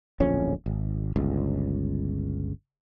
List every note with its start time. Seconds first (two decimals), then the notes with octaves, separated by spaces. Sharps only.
0.20 D1 A#1 F2 C#4
0.66 G#1
1.16 G1 C#2